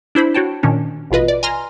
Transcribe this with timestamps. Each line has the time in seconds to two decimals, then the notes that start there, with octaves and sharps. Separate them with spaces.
0.15 D4 E4 C5 B5
0.34 F#4 C#5 G5 A5
0.63 A#2 D#3 C#4 D4
1.11 A1 B2 F4 B4 D#5
1.28 D5
1.43 G#5 A#5 C6 F6 A#6